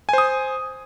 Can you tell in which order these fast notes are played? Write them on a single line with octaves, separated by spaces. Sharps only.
G#5 C5 D#6